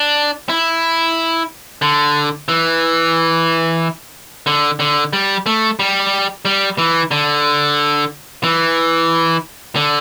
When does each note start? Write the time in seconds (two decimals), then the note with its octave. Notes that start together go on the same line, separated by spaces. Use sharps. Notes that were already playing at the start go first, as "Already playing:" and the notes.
Already playing: D4
0.49 E4
1.82 D3
2.49 E3
4.47 D3
4.80 D3
5.13 G3
5.46 A3
5.79 G3
6.45 G3
6.78 E3
7.11 D3
8.44 E3
9.76 D3